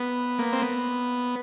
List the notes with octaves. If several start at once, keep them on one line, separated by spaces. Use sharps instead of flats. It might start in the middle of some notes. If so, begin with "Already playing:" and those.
Already playing: B3
A#3
C4
B3